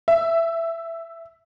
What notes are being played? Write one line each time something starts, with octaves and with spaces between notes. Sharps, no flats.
E5